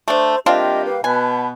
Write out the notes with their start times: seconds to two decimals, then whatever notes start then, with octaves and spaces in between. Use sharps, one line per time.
0.08 A3 D4 C5
0.46 G3 A#3 C4 D4 F4 G4 D#5 E5
0.84 B4 F5
1.04 B2 B3 G#5 A5 B5